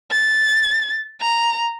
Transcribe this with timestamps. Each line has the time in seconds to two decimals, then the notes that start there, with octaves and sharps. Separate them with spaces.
0.11 A6
1.21 A#5